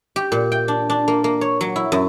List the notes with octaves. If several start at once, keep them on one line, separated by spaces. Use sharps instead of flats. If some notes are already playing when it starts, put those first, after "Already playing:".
G4
A#2
G5
D4
D4
A#3
A#3
C#5
F#3
E4
F#2